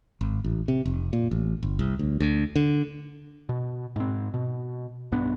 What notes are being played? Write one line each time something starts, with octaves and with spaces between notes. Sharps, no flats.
G#1
A1
C3
F1
A#2
A1
G1
C2
D2
D2
D3
B2
G#2 C4
B2
B1 G2 B3 D4